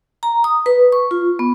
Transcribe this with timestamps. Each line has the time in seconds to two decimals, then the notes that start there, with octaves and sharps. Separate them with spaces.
0.23 A#5
0.44 D#6
0.66 B4
0.92 C#6
1.11 F4
1.39 B3